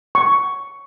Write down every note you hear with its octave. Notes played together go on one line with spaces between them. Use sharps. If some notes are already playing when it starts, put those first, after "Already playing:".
C#6